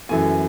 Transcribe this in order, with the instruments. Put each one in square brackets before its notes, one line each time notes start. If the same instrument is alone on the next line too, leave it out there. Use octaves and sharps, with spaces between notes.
[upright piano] F#2 E3 A3 G#5